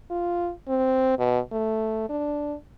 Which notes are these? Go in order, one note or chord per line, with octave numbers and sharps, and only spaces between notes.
F4
C4
B2
A3
D4